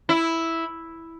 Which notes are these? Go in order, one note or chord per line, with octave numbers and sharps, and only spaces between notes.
E4